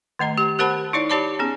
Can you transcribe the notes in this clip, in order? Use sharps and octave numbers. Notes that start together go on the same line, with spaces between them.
D#3 A3 D#5 A#5
G4
G4 A#4 C5 F#5 A5 B5
D#4 E4 C#5 D5
G4 C#5 D5 A5 B5 D6
B3 C#4 G#4